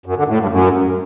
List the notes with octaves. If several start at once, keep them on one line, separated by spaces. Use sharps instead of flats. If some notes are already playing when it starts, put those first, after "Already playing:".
F#2
D3
A2
G2
F#2